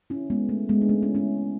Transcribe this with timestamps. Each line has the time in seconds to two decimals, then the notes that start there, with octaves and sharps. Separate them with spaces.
0.10 C#4 E4
0.30 G#3 B3
0.49 A3
0.69 G#3 B3
0.82 D4
0.89 A3 C#4
1.02 C#4 E4
1.15 C#4 E4